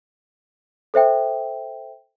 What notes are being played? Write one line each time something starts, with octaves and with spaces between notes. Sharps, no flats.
A4 C5 E5 G5